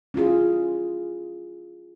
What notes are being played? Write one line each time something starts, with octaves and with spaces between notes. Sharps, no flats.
C#4 E4 F4 G#4